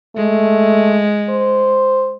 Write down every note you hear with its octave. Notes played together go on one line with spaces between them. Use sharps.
G#3 A3
C5